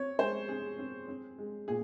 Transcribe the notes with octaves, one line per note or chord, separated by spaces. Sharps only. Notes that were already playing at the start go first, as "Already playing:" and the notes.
Already playing: C4 C#5
G#3 C5
C4 G#4
C4
C4
G#3
A#2 G#4